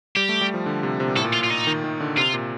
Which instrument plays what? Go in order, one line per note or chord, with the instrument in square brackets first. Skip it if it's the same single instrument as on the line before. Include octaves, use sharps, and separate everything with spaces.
[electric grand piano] G3 [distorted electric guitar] G4
[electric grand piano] A3
G3
F3
D3
C3
C3
A#2
[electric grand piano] A2 [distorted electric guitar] A4
[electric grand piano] A#2
[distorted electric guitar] F4
F4
D#4
[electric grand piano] D#3
D#3
D3
[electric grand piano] C3 [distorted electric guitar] F4
[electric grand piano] A#2